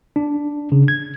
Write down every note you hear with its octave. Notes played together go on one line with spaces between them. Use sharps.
D4
C#3
G#6